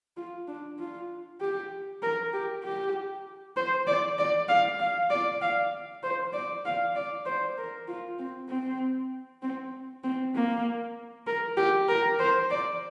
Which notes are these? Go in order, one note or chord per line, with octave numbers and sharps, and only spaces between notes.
F4
D4
F4
G4
A#4
G4
G4
C5
D5
D5
F5
F5
D5
F5
C5
D5
F5
D5
C5
A#4
F4
C4
C4
C4
C4
A#3
A#4
G4
A#4
C5
D5